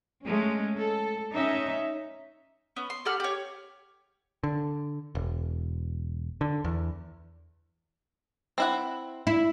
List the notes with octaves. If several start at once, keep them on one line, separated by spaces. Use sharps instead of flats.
G#3 A3 C#4
A4
C#4 D#4 E5
B3 C#4
C6
G4 A4 F#5 F6
G4 C#5
D3
E1
D3
E2
C4 E4 F#5
E4